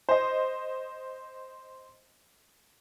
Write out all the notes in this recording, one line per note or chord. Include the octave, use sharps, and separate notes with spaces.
C5 D#5